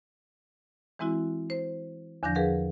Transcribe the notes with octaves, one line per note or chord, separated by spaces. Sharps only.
E3 G#3 C4 E4 F#4
C5
E2 D3 F3 D4 G6 A#6
G#4 A#4 B4 F5 F#5